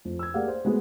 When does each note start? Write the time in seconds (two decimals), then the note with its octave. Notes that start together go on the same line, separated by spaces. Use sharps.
0.05 F2
0.19 E6 G#6
0.34 A#3 G4 G#4 D5 F5 F#5
0.48 C5
0.65 G#3 A3 B3 F#4 G#4 B4